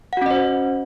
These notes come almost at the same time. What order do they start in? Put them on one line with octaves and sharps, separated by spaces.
F#5 F#4 C#4 D#5 C5